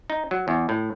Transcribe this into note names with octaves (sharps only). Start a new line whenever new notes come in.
D#4
F#3
E2
A2